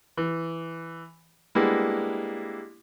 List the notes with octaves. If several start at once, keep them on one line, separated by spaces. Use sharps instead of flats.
E3
G3 G#3 A#3 B3 D4 E4